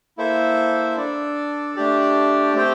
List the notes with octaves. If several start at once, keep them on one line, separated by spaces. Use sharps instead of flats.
A#3 E4 A4 C5 E5
D4 A4 D5
A3 D4 G4 D5
A3 C4 G4 C5 G5